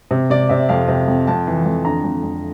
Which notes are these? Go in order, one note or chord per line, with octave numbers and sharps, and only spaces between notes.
C3
C3 D5
C3 E5
F2 F5
C3
F2
F2 A5
E3
F2
D3 A#5
F2
F2